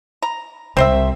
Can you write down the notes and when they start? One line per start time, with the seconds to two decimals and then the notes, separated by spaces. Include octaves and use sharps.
0.22 A#5
0.77 C2 C4 C5 E5